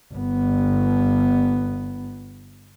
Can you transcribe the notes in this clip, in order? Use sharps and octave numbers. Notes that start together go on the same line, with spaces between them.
G1 B3